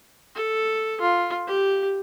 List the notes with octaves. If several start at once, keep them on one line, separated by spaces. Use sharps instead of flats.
A4
F4
G4